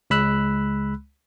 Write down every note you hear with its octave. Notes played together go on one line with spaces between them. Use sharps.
C#2 G#3 B5 E6 F#6